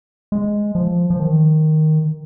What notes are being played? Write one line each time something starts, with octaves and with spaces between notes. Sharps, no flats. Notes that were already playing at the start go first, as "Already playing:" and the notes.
G#3
F3
F3
D#3